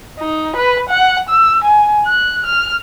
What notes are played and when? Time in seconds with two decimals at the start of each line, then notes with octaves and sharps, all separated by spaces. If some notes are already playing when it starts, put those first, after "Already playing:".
0.19 D#4
0.57 B4
0.89 F#5
1.30 E6
1.64 G#5
2.06 F#6
2.47 F6